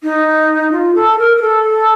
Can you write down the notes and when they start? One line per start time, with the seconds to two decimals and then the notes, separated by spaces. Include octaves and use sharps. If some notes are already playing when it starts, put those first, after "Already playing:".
0.02 D#4
0.72 F4
0.95 A4
1.18 A#4
1.36 A#4
1.41 A4